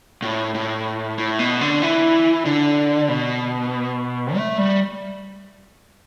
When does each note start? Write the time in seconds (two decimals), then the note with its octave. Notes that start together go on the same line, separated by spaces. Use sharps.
0.22 A2
0.54 A2
1.18 A2
1.39 B2
1.61 D3
1.82 E3
2.45 D3
3.09 B2
4.36 A3
4.58 G3